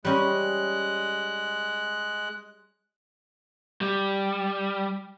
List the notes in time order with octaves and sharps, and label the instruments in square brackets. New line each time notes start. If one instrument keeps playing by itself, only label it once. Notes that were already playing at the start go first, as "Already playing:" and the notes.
[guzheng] G3 C#4 D#4 [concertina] G#3 F#6
[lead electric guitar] G3